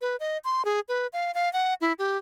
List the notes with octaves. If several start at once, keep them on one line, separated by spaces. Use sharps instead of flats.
B4
D#5
C6
G#4
B4
F5
F5
F#5
E4
G4